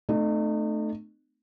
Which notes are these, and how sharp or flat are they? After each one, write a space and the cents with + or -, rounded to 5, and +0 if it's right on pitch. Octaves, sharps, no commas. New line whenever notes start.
A3 +0 C4 -40 D#4 -40